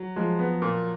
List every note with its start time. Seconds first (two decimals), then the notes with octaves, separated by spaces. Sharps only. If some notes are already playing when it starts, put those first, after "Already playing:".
Already playing: F#3
0.16 F3 G#3
0.39 B3
0.62 A#2